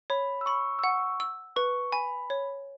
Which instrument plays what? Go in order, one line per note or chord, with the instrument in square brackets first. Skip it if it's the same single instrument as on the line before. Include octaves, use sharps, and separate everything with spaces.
[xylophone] C#5 [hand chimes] B5
[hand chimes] E6
[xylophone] B5 [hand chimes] C#6
[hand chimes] E6
[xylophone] F#5 [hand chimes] C#6
[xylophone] E6
[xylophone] B4 [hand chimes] C#6
[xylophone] G#5 [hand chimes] B5
[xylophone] C#5